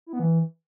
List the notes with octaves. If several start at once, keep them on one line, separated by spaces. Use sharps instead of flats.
E4
B3
E3